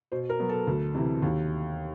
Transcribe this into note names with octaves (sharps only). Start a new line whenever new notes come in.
B2 C5
A#4
F#3 B3
A4
D2
C3 E3
D#2